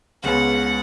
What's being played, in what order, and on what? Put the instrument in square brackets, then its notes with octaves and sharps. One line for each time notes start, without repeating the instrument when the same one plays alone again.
[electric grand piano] C#2 C#3 G#3 B3 [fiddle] F#5